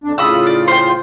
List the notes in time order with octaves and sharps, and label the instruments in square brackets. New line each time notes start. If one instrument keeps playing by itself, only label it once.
[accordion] F2 D4
[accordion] A2 C#3 F4 [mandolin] B5 D#6 E6
[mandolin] D5
C5 G5